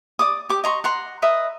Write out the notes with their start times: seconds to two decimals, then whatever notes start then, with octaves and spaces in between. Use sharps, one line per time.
0.19 D5 D6 D#6
0.49 G4 D6
0.64 D#5 A#5 C6 C#6
0.84 F#5 A#5 C6
1.22 B4 D#5 E5 A#5